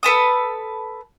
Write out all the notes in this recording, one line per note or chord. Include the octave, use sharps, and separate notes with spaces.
A4 B4 A5 D#6